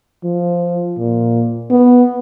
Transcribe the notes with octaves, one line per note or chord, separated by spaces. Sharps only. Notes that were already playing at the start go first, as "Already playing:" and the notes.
F3
A#2
B3